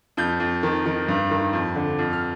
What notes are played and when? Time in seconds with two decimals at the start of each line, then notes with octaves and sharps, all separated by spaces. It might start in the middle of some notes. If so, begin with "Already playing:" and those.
0.17 F2 G6
0.40 F2
0.63 D#3
0.86 D#3
1.08 G2
1.31 D#3
1.53 F2
1.76 D3
1.99 F2
2.13 F6